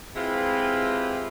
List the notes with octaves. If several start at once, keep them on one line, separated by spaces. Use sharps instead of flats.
G#3 C4 E4 F4 G4 B4